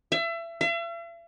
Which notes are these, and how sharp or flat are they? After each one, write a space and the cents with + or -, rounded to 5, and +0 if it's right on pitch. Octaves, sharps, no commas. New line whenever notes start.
E5 +30
E5 +45